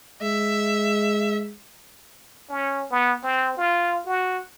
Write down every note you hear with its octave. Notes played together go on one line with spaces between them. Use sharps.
G#3 E5
C#4
B3
C4
F4
F#4